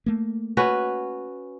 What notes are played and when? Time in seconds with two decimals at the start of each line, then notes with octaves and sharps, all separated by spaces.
0.06 A3 A#3
0.57 C#4 F#4 B4